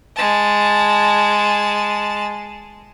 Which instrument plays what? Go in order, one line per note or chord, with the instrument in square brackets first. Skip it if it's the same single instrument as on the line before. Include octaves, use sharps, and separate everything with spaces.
[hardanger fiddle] G#3 A5